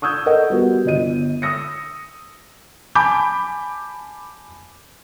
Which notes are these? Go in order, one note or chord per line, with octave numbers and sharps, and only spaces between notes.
C#6 D#6 E6 G6 G#6
A4 A#4 D#5 F#5
G3 B3 F#4
G1 D#5 D#7
D#6 E6 A#6 C#7
G#5 A5 B5 D6 G6